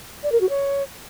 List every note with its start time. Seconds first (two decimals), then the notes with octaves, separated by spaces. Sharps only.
0.23 D5
0.32 A#4
0.41 F#4
0.49 C#5